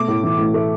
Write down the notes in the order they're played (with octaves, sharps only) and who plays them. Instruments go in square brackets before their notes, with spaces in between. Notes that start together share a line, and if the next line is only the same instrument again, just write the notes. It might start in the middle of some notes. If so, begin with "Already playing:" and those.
Already playing: [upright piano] B2 A3 D6
A2
E3
A2
A3